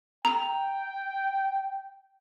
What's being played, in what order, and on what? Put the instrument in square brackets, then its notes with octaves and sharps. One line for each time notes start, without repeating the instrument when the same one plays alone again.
[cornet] G5 [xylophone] A#5